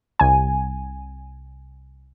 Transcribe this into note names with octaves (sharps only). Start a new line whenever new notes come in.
C2 G#5